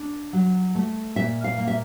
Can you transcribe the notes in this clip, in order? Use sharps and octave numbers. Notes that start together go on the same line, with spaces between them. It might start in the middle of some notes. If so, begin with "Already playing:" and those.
Already playing: D4
F#3
A3
A#2 E5
F5
A#3
E5